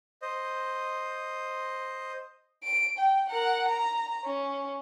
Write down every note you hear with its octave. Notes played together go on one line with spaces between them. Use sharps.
C5 D#5
D7
G5
A#4 F#5
A#5
C#4